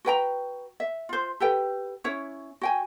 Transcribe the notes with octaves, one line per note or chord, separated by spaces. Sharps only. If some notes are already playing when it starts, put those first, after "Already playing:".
F#4 B4 G5 A#5
E5
F4 C5
G4 A4 B4 G5
C#4 E4 C#5
F#4 G5 G#5